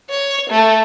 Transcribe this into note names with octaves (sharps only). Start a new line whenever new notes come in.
C#5
A3